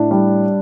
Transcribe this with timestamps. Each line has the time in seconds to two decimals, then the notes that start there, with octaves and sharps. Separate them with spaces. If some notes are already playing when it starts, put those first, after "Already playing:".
Already playing: A2 D4
0.11 G3